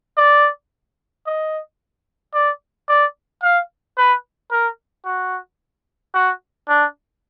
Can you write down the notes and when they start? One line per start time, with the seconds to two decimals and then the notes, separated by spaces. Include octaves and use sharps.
0.17 D5
1.26 D#5
2.34 D5
2.89 D5
3.43 F5
3.97 B4
4.51 A#4
5.06 F#4
6.15 F#4
6.69 D4